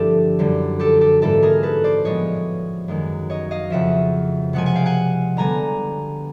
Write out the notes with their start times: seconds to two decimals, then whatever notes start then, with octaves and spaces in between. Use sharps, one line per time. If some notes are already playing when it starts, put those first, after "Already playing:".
Already playing: G2 D3 F3 A3 D4 E4 G4 A4
0.39 F#2 D3 G3
0.79 G4 A4
1.01 G4 A4
1.22 G#2 E3 G3 A#3 G4 A4
1.43 G#4 A#4
1.63 A4 B4
1.84 C5 D5
2.05 A2 F3 G#3 B3 C#5 D#5
2.88 F#2 D#3 G#3
3.30 C#5 D#5
3.51 D#5 F5
3.70 F2 C#3 F3 E5 F#5
4.53 C3 F3 G#3 F#5 G#5
4.66 F#5 G#5
4.75 F5 G5
4.86 F#5 G#5
5.37 D3 G3 B3 G#5 A#5